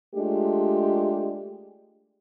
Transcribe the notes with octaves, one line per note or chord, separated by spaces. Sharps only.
G#3 A3 D4 F4 G4